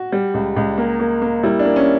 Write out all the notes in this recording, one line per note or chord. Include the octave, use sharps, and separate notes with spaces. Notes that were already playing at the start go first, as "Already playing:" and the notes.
Already playing: F#4
G3
C#2
C#2
A#3
A#3
A#3
G3 E4
D4
A#3
C#4